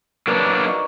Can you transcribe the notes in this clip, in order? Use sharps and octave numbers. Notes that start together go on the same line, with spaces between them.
F#3 A#3 D4 A#4 B4 D5
C#5
D#4 D5 C#6